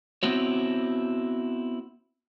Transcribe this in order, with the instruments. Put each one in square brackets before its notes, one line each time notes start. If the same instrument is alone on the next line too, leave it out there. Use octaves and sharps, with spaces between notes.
[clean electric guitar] B3 C4 E4 F#4 C#5